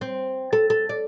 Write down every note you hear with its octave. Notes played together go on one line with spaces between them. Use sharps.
C4
A4
A4
D5